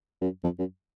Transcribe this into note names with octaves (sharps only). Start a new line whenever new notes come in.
F#2
F2
F#2